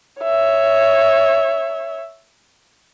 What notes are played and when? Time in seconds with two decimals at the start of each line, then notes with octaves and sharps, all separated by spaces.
0.23 C#5 E5